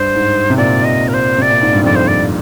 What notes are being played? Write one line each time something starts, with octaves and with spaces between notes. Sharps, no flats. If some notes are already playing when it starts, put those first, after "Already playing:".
Already playing: G2 C5
G#2
C3
A#2 D5
D#5
A#4
C5
C3 D5
A#2
G#2
G2
F2 D5
C5
D5